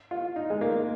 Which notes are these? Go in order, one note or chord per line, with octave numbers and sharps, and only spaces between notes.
F4
D#4
G#3
A#3